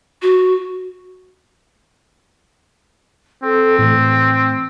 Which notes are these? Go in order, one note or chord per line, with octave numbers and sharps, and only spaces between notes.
F#4
C4 A4
A2 E3 A3